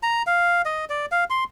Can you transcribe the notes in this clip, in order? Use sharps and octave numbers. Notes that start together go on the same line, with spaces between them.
A#5
F5
D#5
D5
F5
C6